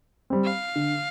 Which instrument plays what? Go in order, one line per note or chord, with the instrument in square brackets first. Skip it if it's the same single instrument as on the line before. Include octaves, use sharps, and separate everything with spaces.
[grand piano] G3 C4
[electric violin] F5
[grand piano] D3